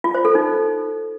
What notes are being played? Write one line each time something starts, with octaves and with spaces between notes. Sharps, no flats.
F4
C5
A4
D#4